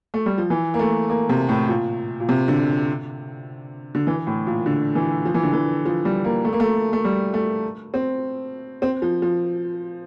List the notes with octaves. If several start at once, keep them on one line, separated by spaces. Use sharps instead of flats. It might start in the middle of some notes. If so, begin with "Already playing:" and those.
A3
G3
F3
E3
A#3
A3
A#3
C3
A2
A#2
A#2
C3
D3
D3
E3
A2
A#2
D3
E3
F3
E3
D3
E3
F3
G3
A#3
A3
A#3
A3
A3
G3
A3
C4
C4
F3
F3